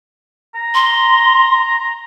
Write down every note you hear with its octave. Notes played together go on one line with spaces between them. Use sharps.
A#5
C6